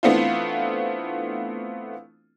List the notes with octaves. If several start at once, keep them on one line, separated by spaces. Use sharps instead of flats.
E3 A3 B3 C4 D4 F4